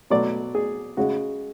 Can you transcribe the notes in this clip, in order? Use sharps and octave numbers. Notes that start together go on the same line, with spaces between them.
B2 F#3 A3 D5
G#4
C#3 G#3 F#4